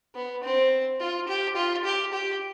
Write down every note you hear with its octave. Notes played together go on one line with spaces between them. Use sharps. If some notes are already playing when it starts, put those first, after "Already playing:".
B3
C4
F4
G4
F4
G4
G4